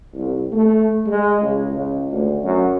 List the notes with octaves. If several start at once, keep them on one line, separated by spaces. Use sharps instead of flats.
C2
A3
G#3
C#2
C#2
D2
F#2